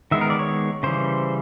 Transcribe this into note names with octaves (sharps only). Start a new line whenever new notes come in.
D#3 G#3 B3 E5
A#4
D5
C#5
C#3 E3 G3 C5